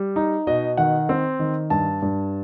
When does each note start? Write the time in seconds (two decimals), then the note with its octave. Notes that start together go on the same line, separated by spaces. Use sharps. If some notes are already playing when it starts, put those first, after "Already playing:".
Already playing: G3
0.16 D#4
0.47 B2 D#5
0.77 D#3 F#5
1.09 C4
1.39 D#3
1.70 G2 A5
2.02 G2